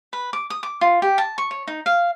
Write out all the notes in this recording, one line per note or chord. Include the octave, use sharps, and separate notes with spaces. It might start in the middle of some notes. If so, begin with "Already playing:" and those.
B4
D6
D#6
D6
F4
G4
A5
C#6
C#5
D#4
F5